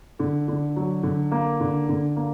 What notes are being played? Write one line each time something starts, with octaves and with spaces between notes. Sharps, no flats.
D3
D3
F#3
D3
A#3
D3
D3
A#3